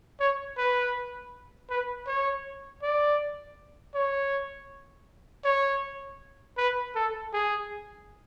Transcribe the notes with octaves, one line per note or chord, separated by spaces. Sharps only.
C#5
B4
B4
C#5
D5
C#5
C#5
B4
A4
G#4